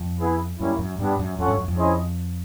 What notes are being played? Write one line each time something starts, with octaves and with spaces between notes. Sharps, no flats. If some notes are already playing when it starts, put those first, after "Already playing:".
Already playing: F2
B3 E4 G#4 B4
F#2 G3 A#3 C#4 E4
F#2
G2 G3 B3 D4 G4
F#2
F2 C#4 F4 A4 C#5 F#5
G2
F#2
F2
C#4 E4 G#4 C5 D#5